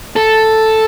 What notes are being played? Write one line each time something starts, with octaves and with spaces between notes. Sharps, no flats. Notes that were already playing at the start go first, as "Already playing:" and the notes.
A4